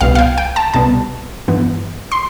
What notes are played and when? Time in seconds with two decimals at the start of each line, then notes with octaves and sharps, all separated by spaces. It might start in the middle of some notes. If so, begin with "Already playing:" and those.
0.01 C2 B2 B3 F5
0.15 F5
0.19 G5
0.38 G5
0.56 A5
0.74 C2 B2 G3 B3 A5
1.48 G2 E3 B3
2.12 C6